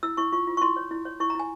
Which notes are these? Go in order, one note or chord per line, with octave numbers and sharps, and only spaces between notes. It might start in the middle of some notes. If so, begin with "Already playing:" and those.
E4 E6
E4 C#6
F4 C#6
F4
C#6
E4 C6
C#5
E4
C#5
E4 C#6
A#5
E4 G#5